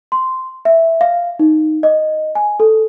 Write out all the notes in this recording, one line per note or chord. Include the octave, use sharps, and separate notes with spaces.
C6
E5
F5
D#4
D#5
G#5
A4